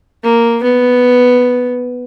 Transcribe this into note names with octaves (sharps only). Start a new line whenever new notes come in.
A#3
B3